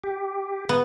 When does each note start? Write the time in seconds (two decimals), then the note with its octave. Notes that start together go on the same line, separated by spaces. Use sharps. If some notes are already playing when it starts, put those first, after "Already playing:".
0.04 G4
0.69 B3